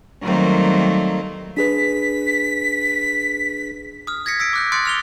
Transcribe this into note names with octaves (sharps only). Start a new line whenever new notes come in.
D#3 F#3 G3 A3 A#3 C4
D4 G#4 B4 B6
D#6 F6
G#6 A#6 B6 C#7
E6 B6 C#7 D7
D6 F#6 G6
C6 D#6 F#6 A6 C#7 D7
F6 F7 G7